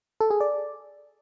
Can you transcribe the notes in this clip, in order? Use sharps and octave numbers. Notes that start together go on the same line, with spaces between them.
A4
G#4
D5